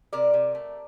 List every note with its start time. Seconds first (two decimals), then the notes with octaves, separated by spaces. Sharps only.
0.13 C3 A#4 D5
0.33 C3
0.55 A3